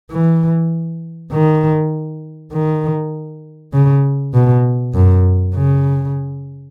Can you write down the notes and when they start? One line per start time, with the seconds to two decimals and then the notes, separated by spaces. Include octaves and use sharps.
0.11 E3
1.32 D#3
2.53 D#3
3.73 C#3
4.34 B2
4.94 F#2
5.55 C#3